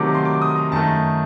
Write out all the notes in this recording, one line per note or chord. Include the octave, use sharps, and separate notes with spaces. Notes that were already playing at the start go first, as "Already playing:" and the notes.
Already playing: C3 D#3 F#3 A3 D6
C6
D6
D#6
A#5
F#2 D#3 A3 A5